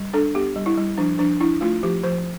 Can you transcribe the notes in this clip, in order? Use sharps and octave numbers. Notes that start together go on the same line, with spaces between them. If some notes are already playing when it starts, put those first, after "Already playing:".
Already playing: G3
D4 A4
B3 G4
G3
E4
G3
F3 D4
F3 D4
D4 E4
A3 F4
F3 G4
F3 C5